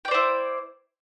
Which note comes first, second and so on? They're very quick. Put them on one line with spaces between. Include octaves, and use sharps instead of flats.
G5 D5 C5 E4